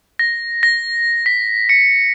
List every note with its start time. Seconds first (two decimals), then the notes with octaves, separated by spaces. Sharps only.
0.19 A#6
0.63 A#6
1.26 B6
1.69 C#7